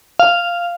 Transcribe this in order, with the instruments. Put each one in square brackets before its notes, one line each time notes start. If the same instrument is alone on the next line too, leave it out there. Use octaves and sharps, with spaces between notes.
[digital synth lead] F5